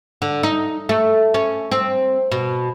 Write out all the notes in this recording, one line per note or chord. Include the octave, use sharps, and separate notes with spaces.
D3
D#4
A3
C#4
C4
B2